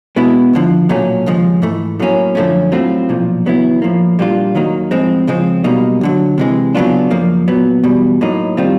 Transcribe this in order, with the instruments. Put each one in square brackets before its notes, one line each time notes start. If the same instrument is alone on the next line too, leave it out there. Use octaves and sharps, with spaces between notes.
[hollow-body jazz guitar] B2 G#3 B3 E4
D#2 D3 F3
B1 A#2 F#3 A3 C#4
D#2 C#3 F3 G#3
G#2 E3 A3
A2 F#3 A#3 C#4
F#2 D3 F3 A3 C#4
A2 F#3 A3 C4 F4
B1 A#2 F3
E2 C#3 F#3 B3 E4
A2 F3 A#3
A#2 G3 A#3 D4 F4
D#2 D#3 F#3 A#3 D#4
A2 F3 G#3 C4
C#2 C#3 F3 G#3 C4
B1 B2 G3 A#3 D#4
D2 D3 F#3
C3 E3 G#3
C#3 F#3 B3 D4 F4
F#2 C#3 F3 A#3
A#2 F#3 B3
E2 B2 G3
A2 F#3 A#3 D#4
D#3 G3 C4 F4